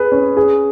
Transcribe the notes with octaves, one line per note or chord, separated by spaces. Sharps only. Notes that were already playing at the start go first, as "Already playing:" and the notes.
Already playing: G#4 B4
C#4
G#4